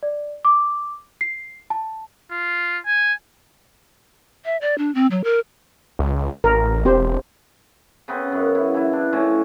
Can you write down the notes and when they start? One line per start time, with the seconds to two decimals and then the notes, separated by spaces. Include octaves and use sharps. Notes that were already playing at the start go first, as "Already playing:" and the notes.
0.03 D5
0.45 D6
1.21 C7
1.70 A5
2.31 F4
2.86 G#5
4.45 E5
4.61 D5
4.78 D4
4.95 C4
5.11 F#3
5.24 A#4
5.99 C#2
6.44 A1 A#4
6.85 E1 C4 G4 C5
8.08 C#3 B3 C4
8.32 F#2
8.55 E4
8.74 E3 E4
8.93 D4
9.13 A2 F3 C#4